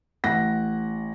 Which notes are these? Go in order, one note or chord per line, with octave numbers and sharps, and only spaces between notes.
A1 F#5 A#6